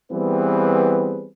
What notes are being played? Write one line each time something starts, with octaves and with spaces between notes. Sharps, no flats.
E3 G3 B3 C4 G#4 B4